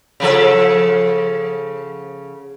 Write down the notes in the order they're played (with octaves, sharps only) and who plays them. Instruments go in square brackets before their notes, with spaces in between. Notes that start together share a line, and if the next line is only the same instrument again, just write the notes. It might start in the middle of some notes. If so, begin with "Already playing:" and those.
[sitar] C#3 F3 A4